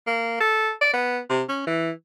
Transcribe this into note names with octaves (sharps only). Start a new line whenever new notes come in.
A#3
A4
D5
B3
C3
C#4
E3